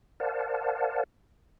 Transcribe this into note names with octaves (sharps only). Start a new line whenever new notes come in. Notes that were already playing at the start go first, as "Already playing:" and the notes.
A#4 C5 D5 F5 F#5 A5